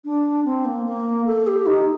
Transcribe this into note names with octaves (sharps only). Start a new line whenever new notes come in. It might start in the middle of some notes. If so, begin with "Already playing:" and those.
D4
C4
A#3
A#3
A4
G4
D#4